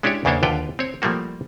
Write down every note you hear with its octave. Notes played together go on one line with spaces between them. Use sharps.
G#3 C#4 D4 E4 G4 C#5
E2 C#3 A#3 D4 C5 C#5
D#2 D3 F4 B4 C#5 G5
C4 C#5
F3 G3 A3 A#3 F#4